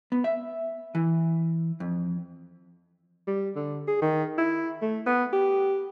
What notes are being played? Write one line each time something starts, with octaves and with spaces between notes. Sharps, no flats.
B3
E5
E3
F2
G3
D3
G#4
D#3
E4
A3
B3
G4